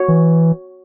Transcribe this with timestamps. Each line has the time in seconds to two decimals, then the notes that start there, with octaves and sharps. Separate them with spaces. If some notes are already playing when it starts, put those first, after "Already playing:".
Already playing: F#4 C#5
0.08 E3